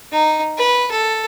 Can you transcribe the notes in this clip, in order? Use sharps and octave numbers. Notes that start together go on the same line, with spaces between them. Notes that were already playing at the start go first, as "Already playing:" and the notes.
D#4
B4
A4